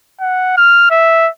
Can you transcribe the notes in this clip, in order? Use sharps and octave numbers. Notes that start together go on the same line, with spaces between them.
F#5
F6
E5